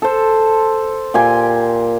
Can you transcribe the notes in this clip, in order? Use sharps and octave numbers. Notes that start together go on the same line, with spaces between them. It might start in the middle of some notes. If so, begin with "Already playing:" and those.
A4 C5
A#2 G4 G#5 C6